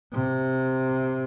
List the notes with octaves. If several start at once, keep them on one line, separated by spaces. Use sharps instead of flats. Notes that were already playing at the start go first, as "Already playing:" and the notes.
C3